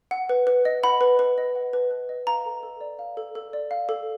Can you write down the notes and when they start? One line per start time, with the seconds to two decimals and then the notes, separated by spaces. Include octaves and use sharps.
0.11 F#5
0.29 B4
0.47 B4
0.65 D#5
0.83 F#5 B5
1.01 B4
1.19 B4
1.38 D#5
1.55 F#5
1.73 B4
1.91 B4
2.09 D#5
2.27 F5 A#5
2.46 A4
2.63 A4
2.81 D5
2.99 F5
3.17 A4
3.35 A4
3.53 D5
3.71 F5
3.89 A4